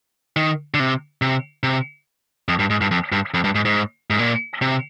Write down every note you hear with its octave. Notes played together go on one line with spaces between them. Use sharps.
D#3
D3
C3
C3
C3
F2
G2
G#2
G2
F2
G2
F2
G2
G#2
G#2
G#2
A#2
C3